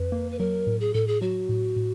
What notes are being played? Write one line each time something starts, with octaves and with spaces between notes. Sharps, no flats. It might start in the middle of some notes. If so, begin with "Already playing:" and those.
Already playing: F2 B4
A#3
B4
F#3 A#4
A2
G#4
A2 A4
G#4
F#3 F#4
A2
A2